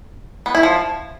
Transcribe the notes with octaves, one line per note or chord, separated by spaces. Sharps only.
B3
E4
F3